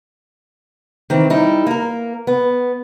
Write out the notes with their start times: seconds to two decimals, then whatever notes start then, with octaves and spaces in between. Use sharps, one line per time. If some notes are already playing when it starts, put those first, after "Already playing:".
1.10 D#3 E3 C4
1.30 G3 D#4 E4
1.66 A#3 A#4
2.27 B3